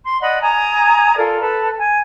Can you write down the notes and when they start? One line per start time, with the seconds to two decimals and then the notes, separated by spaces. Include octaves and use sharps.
0.04 C6
0.20 D5 D#5 F#5 B5
0.42 G#5 A#5 D#6
1.18 F4 A4 A#4 D5
1.40 A4 B4 A5
1.79 G#5